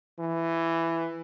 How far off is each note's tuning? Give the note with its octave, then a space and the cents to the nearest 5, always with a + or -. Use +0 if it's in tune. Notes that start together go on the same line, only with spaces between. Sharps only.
E3 +10